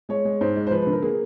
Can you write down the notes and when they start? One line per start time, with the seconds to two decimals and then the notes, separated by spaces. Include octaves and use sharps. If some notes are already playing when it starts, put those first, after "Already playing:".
0.09 G#3 C#5
0.25 G#3
0.41 G#2 C5
0.56 G#3
0.67 C5
0.71 F3 B4
0.82 D3 B4
0.93 A#4
1.02 A#3 G#4